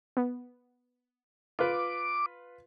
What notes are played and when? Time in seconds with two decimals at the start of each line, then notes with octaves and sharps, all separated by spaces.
0.17 B3
1.59 F4 B4 D6